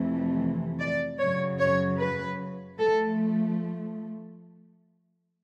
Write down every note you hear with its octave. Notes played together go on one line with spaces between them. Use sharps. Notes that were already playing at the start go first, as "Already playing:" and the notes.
Already playing: F2 C3 E3 A3
D5
F#2 C#3 F#3 C#5
C#5
B4
F3 A3 A4